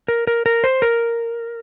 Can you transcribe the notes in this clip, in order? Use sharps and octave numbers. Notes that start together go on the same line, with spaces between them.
A#4
A#4
A#4
C5
A#4